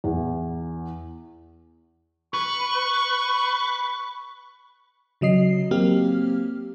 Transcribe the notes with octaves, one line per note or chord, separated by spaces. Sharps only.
E2
B4 C#6
C#3 F#3 D#5 C7
F#3 A#3 C4 G4 F6